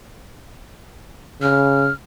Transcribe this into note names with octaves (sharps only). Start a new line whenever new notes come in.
C#3 F6